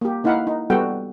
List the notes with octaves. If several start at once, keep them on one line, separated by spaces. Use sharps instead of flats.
A#3 G4
A#3 D#4 E4 F5 F#5 B5
D#4
G3 B3 F#4 A4 F#5 G5